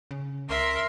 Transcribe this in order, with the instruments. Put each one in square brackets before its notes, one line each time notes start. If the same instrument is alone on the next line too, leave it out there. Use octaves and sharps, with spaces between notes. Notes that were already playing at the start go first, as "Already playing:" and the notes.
[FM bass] C#3
[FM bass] C#2 [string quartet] A#4 E5 C6